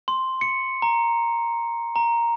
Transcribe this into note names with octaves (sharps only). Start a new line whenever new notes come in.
C6
C#7
A#5
A#5